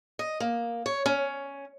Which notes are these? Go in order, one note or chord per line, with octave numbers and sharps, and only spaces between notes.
D#5
A#3
C#5
C#4